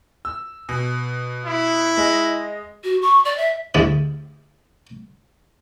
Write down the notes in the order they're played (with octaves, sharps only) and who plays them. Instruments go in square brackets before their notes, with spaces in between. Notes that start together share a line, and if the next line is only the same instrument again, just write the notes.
[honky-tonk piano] E6
B2
[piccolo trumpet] E4
[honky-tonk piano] G#3 D#5
[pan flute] F#4
C#6
D5
E5
[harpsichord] D2 D3 G#3 E4 G4 D5